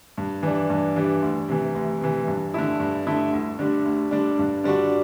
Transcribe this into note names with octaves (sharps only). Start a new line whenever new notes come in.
G2
E3 G3 D4
G2
E3 G3 D4
D2
C3 E3
D2
C3 E3
G2
D3 A3 E4
G2
D3 A3 E4
D2
D3 G3 D4
D2
D3 G3 D4
G2
D3 G3 D4 F#4